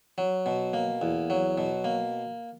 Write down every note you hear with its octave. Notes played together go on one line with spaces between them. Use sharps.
F#3
B2
A#3
E2
F#3
B2
A#3